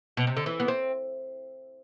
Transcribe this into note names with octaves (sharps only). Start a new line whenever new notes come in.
B2
C3
D3
E3
B3
C4